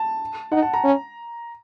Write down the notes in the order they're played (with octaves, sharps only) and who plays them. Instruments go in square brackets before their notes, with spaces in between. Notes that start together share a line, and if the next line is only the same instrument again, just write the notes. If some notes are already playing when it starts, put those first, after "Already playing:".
Already playing: [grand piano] A5
[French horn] D#4 [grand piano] F#5
[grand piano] A5
A#5
[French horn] C#4